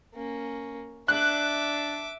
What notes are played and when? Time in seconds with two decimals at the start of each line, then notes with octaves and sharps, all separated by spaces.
0.14 A#3 C#4
1.08 D4 E5 D6 F#6